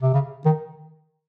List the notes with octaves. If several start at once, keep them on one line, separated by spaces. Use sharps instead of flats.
C3
C#3
D#3